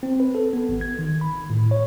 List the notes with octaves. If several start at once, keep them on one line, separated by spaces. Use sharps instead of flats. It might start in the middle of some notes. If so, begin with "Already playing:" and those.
C4
B4
A4
B3
G#1
G#6
D#3
B5
A2
C#5